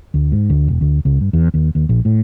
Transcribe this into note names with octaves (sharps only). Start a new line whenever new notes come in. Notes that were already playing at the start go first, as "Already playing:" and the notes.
D2
G#2
D2
E1
D2
C#2
G2
E2
D#2
D#2
A#1
A2